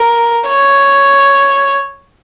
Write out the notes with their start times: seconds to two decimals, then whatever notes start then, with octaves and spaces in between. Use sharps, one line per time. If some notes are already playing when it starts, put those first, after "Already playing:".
Already playing: A#4
0.48 C#5